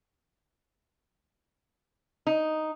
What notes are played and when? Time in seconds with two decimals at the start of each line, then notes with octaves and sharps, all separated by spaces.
2.27 D#4